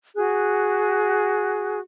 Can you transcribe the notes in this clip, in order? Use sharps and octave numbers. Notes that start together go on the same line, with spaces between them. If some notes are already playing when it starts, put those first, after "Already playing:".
F#4 G#4 F#6